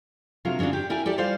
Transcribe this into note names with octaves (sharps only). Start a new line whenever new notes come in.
C3 F#3 D4 F4 A#4 F5
G#2 C#3 F#3 D4 F4
G4
E4 A#4 D5 G#5
E4 G4 A4 D5
G3 F4 C5 D5 F5